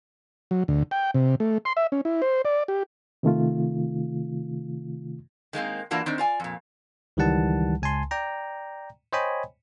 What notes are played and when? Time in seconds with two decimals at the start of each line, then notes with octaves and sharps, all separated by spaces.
0.51 F#3
0.68 D2
0.91 G5
1.14 C3
1.40 A3
1.65 C6
1.77 E5
1.92 C#4
2.05 E4
2.22 C5
2.45 D5
2.68 G4
3.23 C3 D#3 A3 F4
5.53 D#3 G#3 A#3 C4
5.91 E3 A#3 D4 F4 F#4
6.06 D#3 C4 D4
6.18 F4 D5 G#5
6.40 F2 A#2
7.17 C#2 D#3 E3 G3 F#5 A5
7.82 C#2 G#5 A5 C6
8.11 D5 G5 A#5
9.13 C5 C#5 D#5 G5 G#5 B5